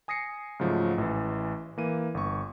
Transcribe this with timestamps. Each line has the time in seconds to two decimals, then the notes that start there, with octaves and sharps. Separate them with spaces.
0.08 G#5 D#6 A#6 C7 C#7
0.60 G#2 C#3 F3 F#3 A3
0.98 A1 E3
1.78 E3 A#3 D#7
2.14 G1 C#6